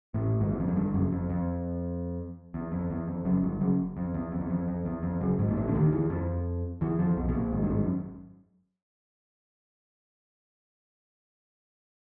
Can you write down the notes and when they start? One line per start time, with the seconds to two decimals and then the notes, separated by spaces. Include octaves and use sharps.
0.14 A1 A2
0.40 G#1 G#2
0.52 E2
0.60 F2
0.68 F#2
0.76 G1 G2
0.94 F#1 F#2
1.12 F2
1.30 F2
2.54 E2
2.72 F2
2.90 E2
3.08 F2
3.25 F#1 F#2
3.43 G1 G2
3.61 F#1 F#2
3.97 F2
4.14 E2
4.32 F2
4.41 E2
4.50 F2
4.68 F2
4.85 E2
5.03 F2
5.21 F#1 F#2
5.39 G#1 G#2
5.49 A#2
5.56 A1 A2
5.68 D3
5.74 D#2 D#3
5.92 E2 E3
6.10 F2 F3
6.81 E2 E3
6.99 F2 F3
7.17 B1 B2
7.29 B2
7.35 A#1 A#2
7.52 G#1 G#2
7.63 G2
7.70 G#1 G#2
7.83 F#2